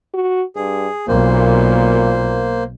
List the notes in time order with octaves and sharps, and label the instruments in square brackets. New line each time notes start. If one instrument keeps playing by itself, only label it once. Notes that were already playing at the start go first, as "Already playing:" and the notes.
[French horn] F#4
[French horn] G2 [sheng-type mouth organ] G#4
[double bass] B1 [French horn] A#2 [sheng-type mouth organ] A#3 C5